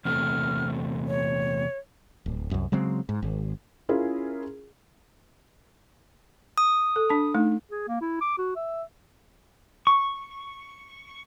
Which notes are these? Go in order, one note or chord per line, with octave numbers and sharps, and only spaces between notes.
E2 C3 A3 F6
C#5
D1
C2 F#2
C#3 F#3 G#3 C4
G#2
G#1
C#4 E4 F4 G#4 A#4
D#6
A4
D4 A5
A3 D#4
G#4
A#3
E4
D6
F#4
E5
C#6